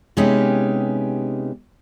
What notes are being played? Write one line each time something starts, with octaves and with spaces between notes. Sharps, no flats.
C3 G#3 B3 C#4 D#4 G4